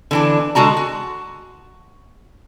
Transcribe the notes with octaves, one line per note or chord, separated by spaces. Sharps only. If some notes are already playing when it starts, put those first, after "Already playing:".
D3 E3 D4
D3 G#3 F#4 A5 A#5
F#4